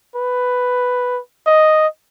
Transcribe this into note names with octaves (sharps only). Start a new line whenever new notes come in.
B4
D#5